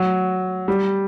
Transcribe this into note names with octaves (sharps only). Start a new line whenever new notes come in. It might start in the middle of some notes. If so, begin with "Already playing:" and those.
Already playing: F#3
G3